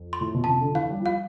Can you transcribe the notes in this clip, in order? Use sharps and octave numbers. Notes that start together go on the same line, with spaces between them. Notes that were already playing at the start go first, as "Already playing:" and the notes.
Already playing: F2
C6
A2
B2
C3 A5
D3
E3 F5
G3
F3
G3 F5